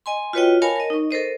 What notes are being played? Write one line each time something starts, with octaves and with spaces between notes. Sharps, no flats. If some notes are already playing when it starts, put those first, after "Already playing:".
D#5 G#5 C6
F4 F#4 B4 C#5 D#5 G5
A#4 C#5 F5 G#5 A5 B5
A#4 D#5
D#4 C#6
A4 A#4 C5 D#5